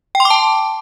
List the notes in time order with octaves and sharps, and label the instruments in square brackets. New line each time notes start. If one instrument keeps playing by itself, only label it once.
[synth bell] G5
C6
D6
A5